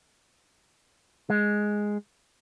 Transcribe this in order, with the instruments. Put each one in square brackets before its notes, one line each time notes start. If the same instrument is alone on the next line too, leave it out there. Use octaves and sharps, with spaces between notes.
[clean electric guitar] G#3